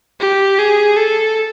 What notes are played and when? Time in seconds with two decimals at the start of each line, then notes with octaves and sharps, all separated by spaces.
0.20 G4
0.59 G#4
0.97 A4